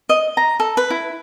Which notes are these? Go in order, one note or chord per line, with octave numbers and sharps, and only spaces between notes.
D#5
A#5
A4
B4
E4